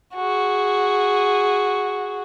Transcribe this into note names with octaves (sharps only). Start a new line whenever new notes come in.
F#4 G#4